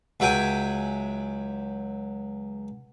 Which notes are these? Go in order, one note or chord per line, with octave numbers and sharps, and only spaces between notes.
C#2 F#3 E5 G5 G#5